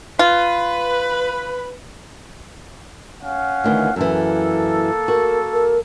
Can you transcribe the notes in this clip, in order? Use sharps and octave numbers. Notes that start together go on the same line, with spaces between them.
F4 B4
C#4 F5 F#5
D2 D#3 E3
F#2 E3 A#3 A4
F#4 A#4
A#4